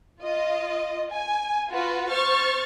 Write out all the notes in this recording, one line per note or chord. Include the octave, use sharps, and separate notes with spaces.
F4 D#5
G#5
F4 F#4 B4
C5 C#6 F6 A6